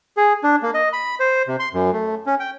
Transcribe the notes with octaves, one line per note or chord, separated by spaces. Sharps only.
G#4
D4
A#3
D#5
B5
C5
C3
C6
F#2
A3
C#4
G5